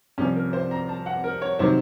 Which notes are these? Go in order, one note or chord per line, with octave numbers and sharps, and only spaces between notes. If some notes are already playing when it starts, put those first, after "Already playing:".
C2 C3 F3 C#4
A#4
C5
A#5
A5
F#5
A#4
C#5
C3 D#3 F#3 C5